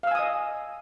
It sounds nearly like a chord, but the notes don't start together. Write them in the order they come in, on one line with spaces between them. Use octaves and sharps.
F5 E6 G#5 D#6 D#5